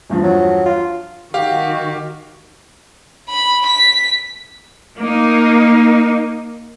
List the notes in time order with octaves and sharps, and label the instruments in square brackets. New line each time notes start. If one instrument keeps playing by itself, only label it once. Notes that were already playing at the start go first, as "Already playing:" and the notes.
[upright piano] E2 G2 F3
[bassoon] F#3
F4
[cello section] D#3 F#4 [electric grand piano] G4 F5
[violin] B5
B6
[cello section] A#3 D#4